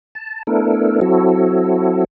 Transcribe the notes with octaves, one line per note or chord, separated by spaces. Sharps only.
A5
A3 B3 D4 E4 A4 A#4
F#3 C4 E4 F#4 A4